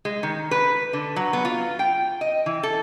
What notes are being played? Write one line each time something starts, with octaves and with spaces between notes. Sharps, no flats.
G#3
D#3
B4
D3
F#3
B3
F4
G5
D#5
E3
A4